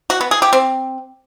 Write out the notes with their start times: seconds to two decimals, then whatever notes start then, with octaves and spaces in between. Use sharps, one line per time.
0.10 F#4
0.21 B3
0.31 G#4
0.42 G4
0.53 C4